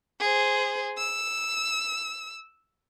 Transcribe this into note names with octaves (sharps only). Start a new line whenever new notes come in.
G#4 C5
E6